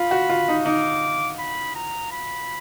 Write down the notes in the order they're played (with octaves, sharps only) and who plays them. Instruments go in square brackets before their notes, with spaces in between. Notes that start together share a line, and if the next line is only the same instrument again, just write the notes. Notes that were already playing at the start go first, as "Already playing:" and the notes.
Already playing: [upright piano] F4 [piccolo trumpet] B5
[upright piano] F#4
F4
D#4
[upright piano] D#4 [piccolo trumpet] D6
[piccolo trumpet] B5
A#5
B5